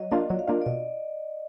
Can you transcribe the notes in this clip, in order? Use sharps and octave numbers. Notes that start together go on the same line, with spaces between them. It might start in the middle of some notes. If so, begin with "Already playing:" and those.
Already playing: F#3 D#5
A#3 D4 F4 D#5
F#3 D5
F5
A#3 D4 F4 D#5
D5
B2 D#5